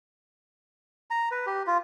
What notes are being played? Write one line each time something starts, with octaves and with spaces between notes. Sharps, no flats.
A#5
B4
G4
F4